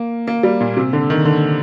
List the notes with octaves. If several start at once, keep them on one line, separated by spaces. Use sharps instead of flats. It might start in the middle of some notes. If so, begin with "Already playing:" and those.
Already playing: A#3
A#3
G3
A#2
C3
D3
D#3
D3